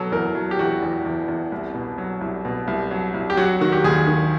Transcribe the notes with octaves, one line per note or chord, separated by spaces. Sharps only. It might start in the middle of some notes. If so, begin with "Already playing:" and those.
Already playing: B2 F#3 A4
E2 A#4
F#3
G4
E2 F#4
E2
E2
E2
C2
B2
F#3
C2
B2
C2
F#3
C2
G4
F#3 F#4
D#3 F#4
G4
D#2 G#4
D#3